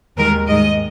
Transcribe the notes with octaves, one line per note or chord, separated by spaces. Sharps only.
D#2 D#3 G#3 A#4
G#2 D#3 G#3 D#5